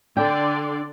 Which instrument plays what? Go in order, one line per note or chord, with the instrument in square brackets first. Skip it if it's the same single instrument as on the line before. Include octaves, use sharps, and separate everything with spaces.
[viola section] D3 D5 C6 [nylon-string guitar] D4 G5